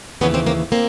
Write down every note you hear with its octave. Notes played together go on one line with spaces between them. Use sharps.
D#2 C#3 E3 B3 C#4
A#3 C4
A#3 C4
A#3 C4